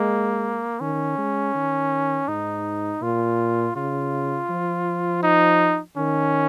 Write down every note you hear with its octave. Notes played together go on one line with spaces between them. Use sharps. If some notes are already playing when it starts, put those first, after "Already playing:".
Already playing: G#3 A#3
D#3 C#4
G#3
D#3
G#2 D#4
A#2 F4
C#3 F4
F3
D#4
D#3 C#4